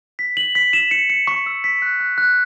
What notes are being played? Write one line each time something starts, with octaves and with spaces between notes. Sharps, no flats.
B6
F#7
B6
E7
C#7
C#7
C#6
E6
B6
F#6
F#6
F#6